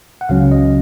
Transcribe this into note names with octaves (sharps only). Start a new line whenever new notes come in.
F#5
C#2 C#3 F#3 C#4 F5
D#5